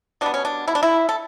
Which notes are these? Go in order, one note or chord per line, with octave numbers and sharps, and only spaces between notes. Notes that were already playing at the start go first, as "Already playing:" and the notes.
B2 G3 B3 D4
C#4
D4
E4
D4
E4
A4